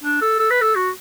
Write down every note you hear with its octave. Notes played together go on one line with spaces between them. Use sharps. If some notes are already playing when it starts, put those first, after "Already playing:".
D4
A4
A4
B4
A4
F#4